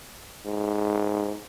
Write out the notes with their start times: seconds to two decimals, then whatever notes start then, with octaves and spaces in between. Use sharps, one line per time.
0.46 G#2